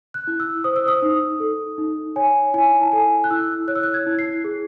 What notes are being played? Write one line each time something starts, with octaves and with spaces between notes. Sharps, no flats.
F#6
E4
E6
C5 D#6
E6
D#6
D#4
A4
D#4
C#5 G#5
E4 G#5
A5
A4 G#5
F#6
E4 E6
C#5 F#6
E6
F#6
G#6
E4
C7
G#4